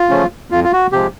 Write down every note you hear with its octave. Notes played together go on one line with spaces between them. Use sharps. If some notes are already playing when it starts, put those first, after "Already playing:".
Already playing: F4
C#3 F3 A3 C#4
F2 F4
F4
F#4
C3 F3 G#3 G4